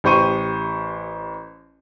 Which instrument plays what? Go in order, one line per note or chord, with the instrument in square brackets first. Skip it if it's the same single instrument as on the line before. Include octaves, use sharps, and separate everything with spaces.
[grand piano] A1 G4 C5 C#6 D#7